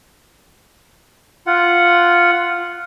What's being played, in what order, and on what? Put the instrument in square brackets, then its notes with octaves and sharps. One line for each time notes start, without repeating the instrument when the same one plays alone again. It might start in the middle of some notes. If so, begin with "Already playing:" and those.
[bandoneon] F4 F#5